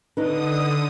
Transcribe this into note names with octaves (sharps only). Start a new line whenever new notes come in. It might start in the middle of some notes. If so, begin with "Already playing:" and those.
D3 D4 D#4 B4 D#6